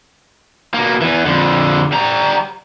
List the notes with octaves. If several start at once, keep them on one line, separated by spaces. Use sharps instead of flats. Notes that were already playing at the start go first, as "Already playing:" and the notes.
B2 A#3
E2 E3
F2 D3
G3 A#5